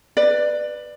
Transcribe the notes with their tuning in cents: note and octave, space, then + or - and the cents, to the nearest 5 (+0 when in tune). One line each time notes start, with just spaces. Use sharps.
B4 +0 D5 +20